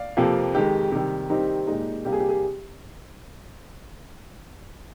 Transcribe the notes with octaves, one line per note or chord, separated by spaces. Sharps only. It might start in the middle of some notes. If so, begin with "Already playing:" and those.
Already playing: D5 F5
F2 C3 F3 A#3
F2 D#3 G#3 G4
C3 D#3 G3
D#3 G3 C4 D#4 G4
A#2 G#3 D#4
C3 G3 A#3 G4
G#4
G4
G#4